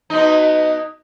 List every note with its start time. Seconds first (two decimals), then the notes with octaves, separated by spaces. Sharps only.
0.10 B2 D#4